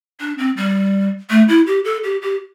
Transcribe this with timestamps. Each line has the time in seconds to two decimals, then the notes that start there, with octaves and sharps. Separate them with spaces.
0.20 D4
0.38 C4
0.57 G3
1.30 A3
1.48 E4
1.67 G4
1.85 A4
2.04 G4
2.22 G4